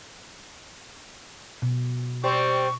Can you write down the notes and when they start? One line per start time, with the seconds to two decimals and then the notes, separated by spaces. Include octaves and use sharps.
1.62 B2
2.24 G3 C4 C#6